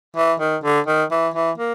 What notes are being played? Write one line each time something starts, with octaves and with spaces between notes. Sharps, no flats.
E3
D#3
D3
D#3
E3
E3
A#3